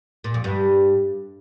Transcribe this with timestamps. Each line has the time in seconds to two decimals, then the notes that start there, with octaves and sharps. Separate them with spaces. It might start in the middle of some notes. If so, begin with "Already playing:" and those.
0.24 A#2
0.34 F2
0.44 G2